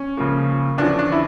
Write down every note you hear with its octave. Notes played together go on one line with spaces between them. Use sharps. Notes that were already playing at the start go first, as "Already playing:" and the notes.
Already playing: C#4
C#2 C#3 F3 A#3
E2 D3 F3 C#4 D4
D4
E4